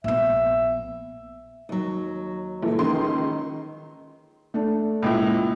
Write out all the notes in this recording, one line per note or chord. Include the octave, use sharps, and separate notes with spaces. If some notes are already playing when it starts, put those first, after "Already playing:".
A#1 B3 E5
D#2 F#3
A#1 E3 A4
C#2 D#3 C#4 C6
A3 D4
C#2 A#2 E4